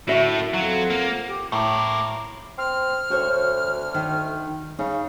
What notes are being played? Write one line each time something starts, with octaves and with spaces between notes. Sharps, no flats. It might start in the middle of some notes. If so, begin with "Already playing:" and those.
A2 D3 F#4 E5
F#2 E4
F2 F#3 F4 F#5
A#3
G4
A2 A3 A#4 D6
C4 F6
D2 F#4 C5 C#5
D#3
C#3 D#4